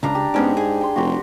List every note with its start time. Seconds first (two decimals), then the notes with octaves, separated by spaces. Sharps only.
0.03 C#2 C#3 D4 A#5
0.15 G4
0.34 G#2 B3 C#4 D4
0.57 G#4
0.81 G5 C6
0.96 F1 F#4 G4